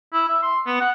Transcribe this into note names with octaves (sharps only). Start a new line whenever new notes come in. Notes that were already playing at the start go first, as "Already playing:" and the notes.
E4
E5
C6
B3
F#5